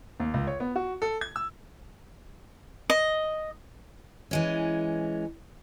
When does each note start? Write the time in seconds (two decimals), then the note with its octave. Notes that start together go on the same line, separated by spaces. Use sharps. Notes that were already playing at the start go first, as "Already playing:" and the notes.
0.20 D#2
0.34 C#2
0.47 C#5
0.60 B3
0.76 F#4
1.02 A4
1.21 G#6
1.36 E6
2.90 D#5
4.31 E3 G#3 C#4